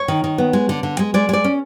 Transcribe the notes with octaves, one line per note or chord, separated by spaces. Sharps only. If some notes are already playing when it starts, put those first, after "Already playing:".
Already playing: C#5
D#3
D#3
B3
G#3
D3
D3
G#3
G#3 D5
G#3 D5
C#4